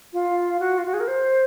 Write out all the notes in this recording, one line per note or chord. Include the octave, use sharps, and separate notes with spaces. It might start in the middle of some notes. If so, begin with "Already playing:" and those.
F4
F#4
F4
F#4
G#4
A#4
C5